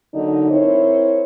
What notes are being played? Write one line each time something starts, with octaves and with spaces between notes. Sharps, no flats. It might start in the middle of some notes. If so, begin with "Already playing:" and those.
D3 F#3 A#3 D4 D#4
C4 E4 A#4 C5 C#5